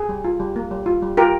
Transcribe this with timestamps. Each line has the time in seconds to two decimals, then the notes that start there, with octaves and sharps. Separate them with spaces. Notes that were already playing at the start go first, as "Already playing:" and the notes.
Already playing: G#4
0.09 G3
0.24 F4
0.40 G3
0.56 A#3
0.71 G3
0.86 F4
1.02 G3
1.17 F4 G4 A#4